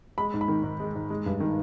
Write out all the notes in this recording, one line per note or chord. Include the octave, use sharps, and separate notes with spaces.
G#3 B5
G#2
B5
D#3
G#2
G#3
G#2
G#3
G2
D#3